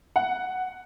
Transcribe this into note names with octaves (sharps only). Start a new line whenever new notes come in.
F#5